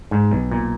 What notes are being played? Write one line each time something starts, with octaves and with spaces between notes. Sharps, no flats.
G#2
B1
A#2